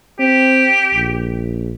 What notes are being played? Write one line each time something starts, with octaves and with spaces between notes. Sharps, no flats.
C4 G4
A#1